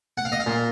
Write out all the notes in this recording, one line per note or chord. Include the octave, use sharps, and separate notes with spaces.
F#5
F5
D#5
F5
A#2